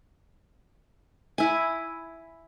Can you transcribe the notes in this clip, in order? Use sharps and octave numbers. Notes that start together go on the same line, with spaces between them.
E4 G#5